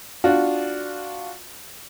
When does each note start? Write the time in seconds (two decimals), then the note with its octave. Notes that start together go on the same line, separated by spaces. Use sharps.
0.24 D4 F4 F#4